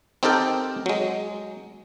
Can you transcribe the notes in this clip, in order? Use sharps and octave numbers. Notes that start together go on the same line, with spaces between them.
C4 D#4 G4 A4 A#4 G5
F#3 G#3